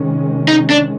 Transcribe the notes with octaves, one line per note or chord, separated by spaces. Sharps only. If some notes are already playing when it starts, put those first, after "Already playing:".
Already playing: C3 D#3 G#3 C#4
D#4
D4